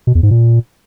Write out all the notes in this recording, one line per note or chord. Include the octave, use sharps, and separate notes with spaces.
B2
E2
G#2
A#2